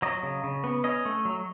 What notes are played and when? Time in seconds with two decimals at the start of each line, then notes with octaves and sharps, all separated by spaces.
0.02 F#3 D#5
0.23 C#3
0.44 C#3
0.64 B3
0.84 C#4 D#5
1.05 A3
1.25 F#3